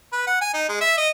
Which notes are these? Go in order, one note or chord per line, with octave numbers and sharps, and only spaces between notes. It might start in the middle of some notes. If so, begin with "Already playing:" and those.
B4
F#5
G#5
D#4
G#3
E5
D#5